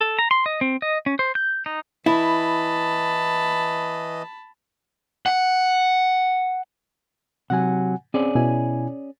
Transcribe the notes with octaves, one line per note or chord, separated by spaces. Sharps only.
A4
A#5
C6
D#5
C4
D#5
C#4
C5
G6
D#4
E3 E4 D#5 A5 B5
F#5
C3 F#3 F#5 G#5
C4 C#4 G#4 D5
B2 E4 G#5